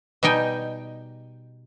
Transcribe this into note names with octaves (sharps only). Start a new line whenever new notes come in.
B2 G3 D#4 G5 G#5